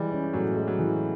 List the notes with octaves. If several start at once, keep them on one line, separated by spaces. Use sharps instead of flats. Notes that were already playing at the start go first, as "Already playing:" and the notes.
Already playing: E3 G3 G#3
C#4
A2 F#3
G#3
F#3
E3